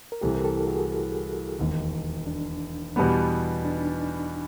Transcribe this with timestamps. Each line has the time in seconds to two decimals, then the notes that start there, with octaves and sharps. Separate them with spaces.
0.12 A#4
0.21 C2 C3 E3 G4 A4
0.35 A#4
0.45 G4 A4
0.68 F#4 G#4
1.59 E1 D#2 D#3
2.27 D4
2.96 E2 B2 G3 B3
3.65 D4
3.72 D#4
3.80 D4